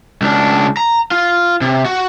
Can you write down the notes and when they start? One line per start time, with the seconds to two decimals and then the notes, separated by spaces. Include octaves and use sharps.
0.22 C#2 D4
0.77 A#5
1.11 F4
1.61 C3
1.85 F#4